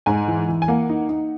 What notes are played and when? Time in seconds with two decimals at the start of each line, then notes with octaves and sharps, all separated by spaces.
0.06 G#2 G#5
0.28 E3
0.48 E3
0.62 G#5
0.68 A#3 F#5
0.89 D#4
1.09 D#4